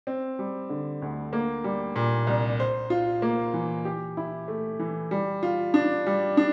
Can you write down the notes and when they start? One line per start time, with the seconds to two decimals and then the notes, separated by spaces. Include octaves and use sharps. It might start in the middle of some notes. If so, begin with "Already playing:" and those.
0.07 C4
0.39 G3
0.69 D3
1.02 D2
1.33 A#3
1.64 G3
1.96 A#2
2.27 C2
2.60 C5
2.90 F4
3.22 A#3
3.54 E3
3.85 G4
4.17 E4
4.48 A3
4.79 E3
5.11 G3
5.43 F4
5.74 D4
6.07 G3
6.37 D4